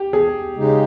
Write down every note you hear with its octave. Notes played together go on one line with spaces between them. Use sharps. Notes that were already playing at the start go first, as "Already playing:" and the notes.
Already playing: G4
G#4
C#3 G#3 D#4 G4